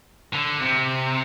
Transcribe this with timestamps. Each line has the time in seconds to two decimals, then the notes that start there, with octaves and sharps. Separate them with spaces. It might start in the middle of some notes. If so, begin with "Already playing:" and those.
0.34 D3
0.60 C3